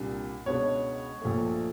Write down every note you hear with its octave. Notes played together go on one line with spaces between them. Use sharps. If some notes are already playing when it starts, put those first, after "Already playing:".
Already playing: C2 A#2 G3 A#3 D4
C#2 B2 G#3 B3 D4 C#5
A#1 A#2 F3 A3